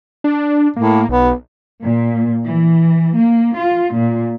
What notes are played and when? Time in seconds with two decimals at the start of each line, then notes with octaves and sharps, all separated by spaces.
0.24 D4
0.76 A2 A#3
1.09 B1 B3
1.83 A#2
2.45 E3
3.15 A#3
3.56 F4
3.95 A#2